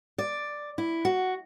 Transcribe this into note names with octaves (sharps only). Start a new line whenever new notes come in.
D5
E4
F#4